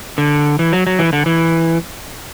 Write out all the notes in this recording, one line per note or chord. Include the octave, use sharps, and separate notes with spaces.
D3
E3
F#3
F#3
E3
D3
E3